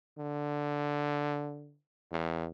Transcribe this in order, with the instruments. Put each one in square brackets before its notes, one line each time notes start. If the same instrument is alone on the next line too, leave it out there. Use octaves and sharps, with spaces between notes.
[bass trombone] D3
E2